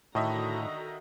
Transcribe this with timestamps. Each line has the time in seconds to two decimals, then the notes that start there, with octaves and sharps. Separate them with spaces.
0.15 A2 D3 D#3 F#4 D#5 E5 A#5